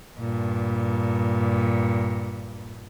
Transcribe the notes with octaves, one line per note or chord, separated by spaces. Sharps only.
G2 A#2